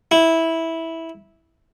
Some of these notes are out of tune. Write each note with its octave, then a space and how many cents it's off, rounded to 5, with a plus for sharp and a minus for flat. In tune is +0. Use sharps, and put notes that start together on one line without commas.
E4 -10